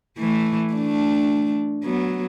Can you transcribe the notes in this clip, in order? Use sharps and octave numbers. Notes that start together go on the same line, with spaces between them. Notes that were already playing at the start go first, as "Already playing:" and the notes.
E3 A3
A3 D4
F#3 B3